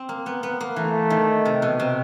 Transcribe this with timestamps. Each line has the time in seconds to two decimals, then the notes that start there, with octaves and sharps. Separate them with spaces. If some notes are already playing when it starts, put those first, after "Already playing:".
Already playing: C4
0.09 A#3
0.26 B3
0.43 B3
0.61 A#3
0.76 E3 A3
1.10 D#3
1.45 C3
1.62 B2
1.80 C3